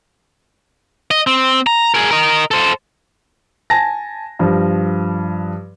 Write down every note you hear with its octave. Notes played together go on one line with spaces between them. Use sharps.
D#5
C4
A#5
G#4 A#4
A#4 D#5
A4 C5
G#5 A5 A#6
G2 F3